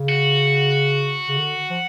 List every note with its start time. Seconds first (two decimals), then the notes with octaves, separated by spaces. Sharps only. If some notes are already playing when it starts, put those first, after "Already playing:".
Already playing: C#3
0.09 F#4
1.29 C#3
1.37 D3
1.70 F3